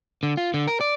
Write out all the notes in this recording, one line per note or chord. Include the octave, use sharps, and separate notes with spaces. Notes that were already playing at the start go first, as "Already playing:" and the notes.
D3
F4
D3
A#4
D5